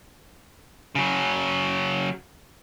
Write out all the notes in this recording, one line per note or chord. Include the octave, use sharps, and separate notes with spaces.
C#3 F#3